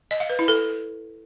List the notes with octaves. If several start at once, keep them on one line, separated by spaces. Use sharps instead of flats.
D#5
F5
B4
E4
A4